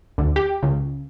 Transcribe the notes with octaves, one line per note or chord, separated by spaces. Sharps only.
D2
G4
C#2